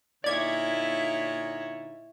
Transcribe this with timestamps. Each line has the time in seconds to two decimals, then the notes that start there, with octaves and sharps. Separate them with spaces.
0.24 A#2 D3 D#4 E4 C#5 D5 G#6